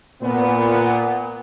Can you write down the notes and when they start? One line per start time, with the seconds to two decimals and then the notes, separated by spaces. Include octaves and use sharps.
0.22 A#2 B3